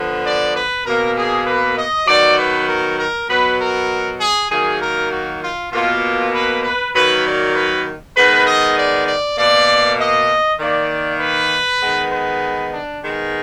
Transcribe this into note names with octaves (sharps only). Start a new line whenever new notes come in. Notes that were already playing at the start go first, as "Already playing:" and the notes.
Already playing: D3 F3 B3
D5
B4
B2 A#3 A#4
G#4
B4
D#5
D#3 F#3 B3 D5
B4
A#4
A#4
B2 F#3 B3 B4
A#4
G#4
D#3 F#3 A#3 G#4
A#4
F#4
F4
B2 A#3 F4
B4
B4
D#3 F#3 A#3 B4
D5
B4
D#3 G#3 B3 B4
D#5
D5
D5
B2 A#3 D5
D#5
D#3 A#3 D5
B4
D#3 G#3 B3
B4
D4
D#3 G#3 B3